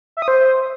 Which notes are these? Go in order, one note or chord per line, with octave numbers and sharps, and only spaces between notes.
E5
D#6
C5